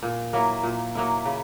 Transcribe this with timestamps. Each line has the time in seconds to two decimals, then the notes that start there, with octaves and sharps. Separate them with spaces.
0.03 A#2
0.33 F#3 A#3 E4
0.64 A#2
0.95 F#3 A#3 E4
1.25 C#3